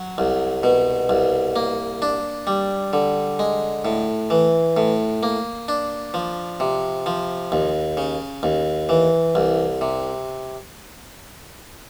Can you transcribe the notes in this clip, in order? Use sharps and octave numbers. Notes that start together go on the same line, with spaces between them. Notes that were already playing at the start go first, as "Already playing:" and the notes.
Already playing: F#3
C2
B2
C2
A#3
D4
G3
D3
G#3
A2
E3
A2
A#3
D4
F3
C3
F3
D#2
C#3
D#2
E3
C2
C3